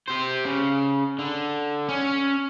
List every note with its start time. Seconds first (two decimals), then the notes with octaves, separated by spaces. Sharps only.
0.08 G4 C5
0.45 C#3
1.19 D3
1.89 C#4